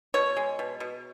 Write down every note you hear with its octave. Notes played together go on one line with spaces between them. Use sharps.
B2 C#5
G#3
B2
B2